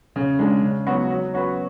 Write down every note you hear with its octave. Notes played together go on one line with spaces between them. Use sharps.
C#3
G#3 D4
C#3
F#3 B3 F#4
F#3
C#4 F#4 B4